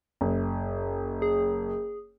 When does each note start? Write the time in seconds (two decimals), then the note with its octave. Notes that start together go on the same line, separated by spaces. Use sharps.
0.21 F#1
1.22 G#4